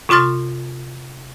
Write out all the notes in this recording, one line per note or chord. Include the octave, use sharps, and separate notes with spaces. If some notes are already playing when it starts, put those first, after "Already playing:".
C3 F4 C6 F6 A6